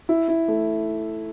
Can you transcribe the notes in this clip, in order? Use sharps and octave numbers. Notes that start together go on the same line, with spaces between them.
E4
E4
A3